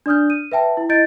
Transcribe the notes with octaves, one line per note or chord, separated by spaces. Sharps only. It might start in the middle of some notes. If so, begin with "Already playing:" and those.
D4 D5 D#6 F6 G6
D#7
B4 E5 G5 A5
E4
E4 D#5 G6 A6 D7